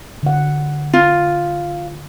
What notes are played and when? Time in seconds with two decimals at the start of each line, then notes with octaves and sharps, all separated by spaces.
0.23 D3 F#5
0.93 F4